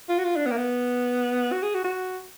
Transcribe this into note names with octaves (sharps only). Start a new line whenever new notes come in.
F4
F#4
F4
D4
B3
A#3
B3
F#4
G#4
F#4
F#4